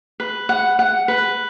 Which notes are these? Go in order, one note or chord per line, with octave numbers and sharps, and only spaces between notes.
B4
F#5
F#5
B4